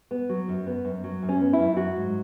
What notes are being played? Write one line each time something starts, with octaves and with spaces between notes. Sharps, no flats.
B3
F#3
F#2
B3
F#2
F#3
F#2
C#4
B3
E4
F#2
F#3 F#4
G#2